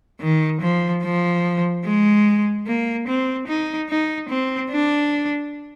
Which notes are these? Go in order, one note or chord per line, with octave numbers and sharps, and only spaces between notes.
D#3
F3
F3
G#3
A#3
C4
D#4
D#4
C4
D4